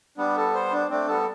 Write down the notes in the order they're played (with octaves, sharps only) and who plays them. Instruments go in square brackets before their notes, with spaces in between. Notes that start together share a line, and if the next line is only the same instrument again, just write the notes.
[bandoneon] G3 B3 [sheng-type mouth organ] D4
[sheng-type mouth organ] A4
C5
D4
[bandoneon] A3 C4 [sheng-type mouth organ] D4
[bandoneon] G3 B3 [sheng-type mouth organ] A4